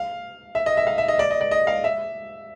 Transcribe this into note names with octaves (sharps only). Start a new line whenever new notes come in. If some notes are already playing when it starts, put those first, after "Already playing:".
Already playing: F5
E5
D#5
E5
F5
E5
D#5
D5
D#5
D5
D#5
F5
E5